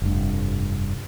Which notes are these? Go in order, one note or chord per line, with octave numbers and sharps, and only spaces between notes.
F1 G2